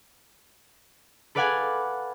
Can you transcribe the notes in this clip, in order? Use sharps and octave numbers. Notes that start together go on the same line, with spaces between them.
A4 B4 D5 F5 F#5 G#5